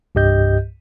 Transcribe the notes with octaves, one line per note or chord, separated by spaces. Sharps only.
C2 G2 G4 D#5 G6